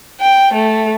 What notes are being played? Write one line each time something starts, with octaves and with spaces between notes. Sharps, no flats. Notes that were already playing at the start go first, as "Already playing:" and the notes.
G5
A3